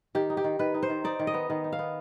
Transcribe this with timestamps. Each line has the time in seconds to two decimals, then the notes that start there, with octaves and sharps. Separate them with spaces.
0.15 D#3 G4
0.30 D#4
0.37 G4
0.44 D#3
0.59 D#3 B4
0.74 D#4
0.83 C5
0.90 D#3
1.04 D#4 D5
1.19 D#3
1.27 D#5
1.34 B3
1.50 D#3
1.64 D#4
1.73 F5
1.79 B3